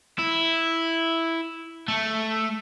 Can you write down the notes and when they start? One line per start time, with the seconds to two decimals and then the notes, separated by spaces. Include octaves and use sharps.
0.19 E4
1.88 A3